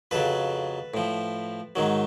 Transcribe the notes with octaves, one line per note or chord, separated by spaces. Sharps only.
F2 C#3 F#3 A4 B4
A2 F3
G#2 D#3 F#3